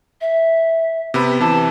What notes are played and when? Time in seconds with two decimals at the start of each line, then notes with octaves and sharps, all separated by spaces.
0.21 E5
1.14 C3 B3 B5
1.40 C3 E3 A5